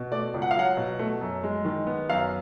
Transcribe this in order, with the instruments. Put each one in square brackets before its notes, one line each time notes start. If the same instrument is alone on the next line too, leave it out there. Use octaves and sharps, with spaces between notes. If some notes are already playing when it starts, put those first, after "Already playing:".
Already playing: [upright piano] B2
A3 D5
C#2
F#5
F5
F#3 F#5
B2
A3
F#2
G#3
D#3
B3
F#2 F5